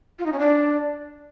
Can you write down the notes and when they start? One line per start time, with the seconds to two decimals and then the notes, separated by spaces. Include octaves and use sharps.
0.19 F4
0.26 D#4
0.33 C#4
0.39 D4